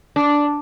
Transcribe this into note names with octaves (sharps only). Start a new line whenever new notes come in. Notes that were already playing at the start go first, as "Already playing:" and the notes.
D4